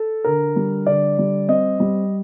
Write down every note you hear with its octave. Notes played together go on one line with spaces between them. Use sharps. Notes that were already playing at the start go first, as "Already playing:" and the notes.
Already playing: A4
D3 A#4
G3
D3 D5
G3
C4 D#5
G3